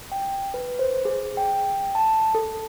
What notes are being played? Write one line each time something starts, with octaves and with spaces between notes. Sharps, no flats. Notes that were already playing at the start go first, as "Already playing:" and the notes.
G5
B4
C5
G#4
G5
A5
A4